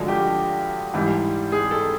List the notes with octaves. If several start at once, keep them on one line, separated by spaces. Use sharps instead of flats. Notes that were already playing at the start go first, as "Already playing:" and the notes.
Already playing: G2 D3 F3 G#3 F#4
G4
G#2 E3 G3
G#4
A4